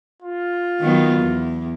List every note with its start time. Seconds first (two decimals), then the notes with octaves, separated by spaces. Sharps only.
0.22 F4
0.80 D#3 F#3 B3
1.19 E2